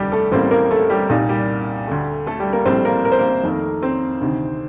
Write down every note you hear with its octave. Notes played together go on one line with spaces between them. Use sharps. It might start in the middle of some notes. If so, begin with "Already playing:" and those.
Already playing: F1 D#2 D3 G3 G4
A3 A4
A1 A2 G3 A#3 C4 C5
A#3 A#4
A3 A4
G3 G4
C2 A#2 G3 A#3 D#4
G3 G4
D2 D3 A3
A3 A4
G3 G4
A#3 A#4
A#1 A2 G3 C4 C5
A#3 A#4
A#4
C5
A#3 A#4
F2 D#3 A3
C4 C5
D2 C3 D#3